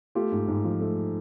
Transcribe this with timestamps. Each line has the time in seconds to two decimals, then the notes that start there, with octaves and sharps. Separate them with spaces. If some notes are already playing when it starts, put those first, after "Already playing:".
0.15 A3 F4 G4
0.32 G#2
0.48 G#2
0.65 F3
0.80 A3